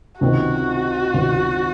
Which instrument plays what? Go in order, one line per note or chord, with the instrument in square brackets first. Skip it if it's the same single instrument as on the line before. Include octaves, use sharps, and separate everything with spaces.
[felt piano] C#2 C3 D#3 [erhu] F#4
[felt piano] C#2 C3 D#3